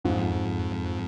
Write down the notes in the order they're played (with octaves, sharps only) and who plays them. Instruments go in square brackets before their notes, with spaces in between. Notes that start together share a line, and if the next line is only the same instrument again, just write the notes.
[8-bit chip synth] F2 [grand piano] G#2 F3 G#3